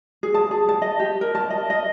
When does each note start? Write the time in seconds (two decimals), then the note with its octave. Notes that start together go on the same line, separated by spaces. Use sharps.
0.23 G#4
0.34 A5
0.51 G#4
0.69 A5
0.82 D#5
1.00 G4
1.21 A#4
1.35 A5
1.50 D#5
1.70 D#5